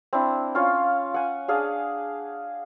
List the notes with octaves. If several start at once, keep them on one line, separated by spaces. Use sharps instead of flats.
C4 D4 E4
C#4 F4 C#5 F5
F#5 G#5
D4 G#4 F5 F#5